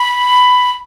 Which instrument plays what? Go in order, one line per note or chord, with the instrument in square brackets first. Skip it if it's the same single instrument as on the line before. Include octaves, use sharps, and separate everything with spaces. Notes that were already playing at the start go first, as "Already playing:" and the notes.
Already playing: [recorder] B5